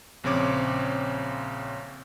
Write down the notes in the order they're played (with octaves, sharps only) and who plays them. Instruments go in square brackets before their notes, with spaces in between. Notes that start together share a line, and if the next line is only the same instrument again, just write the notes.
[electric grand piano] A#1 C#3 C4 C#5 D6